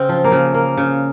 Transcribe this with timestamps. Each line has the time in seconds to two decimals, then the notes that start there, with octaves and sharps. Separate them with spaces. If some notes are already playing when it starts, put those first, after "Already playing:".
Already playing: C#3 C4
0.09 F3
0.24 A#3
0.32 C#3
0.54 A#3
0.77 C#3